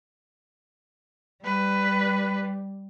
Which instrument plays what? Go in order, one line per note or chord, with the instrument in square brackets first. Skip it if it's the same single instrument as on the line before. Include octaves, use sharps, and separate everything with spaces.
[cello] G3 [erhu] B4